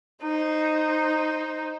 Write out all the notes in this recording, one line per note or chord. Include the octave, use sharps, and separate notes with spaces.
D#4 C5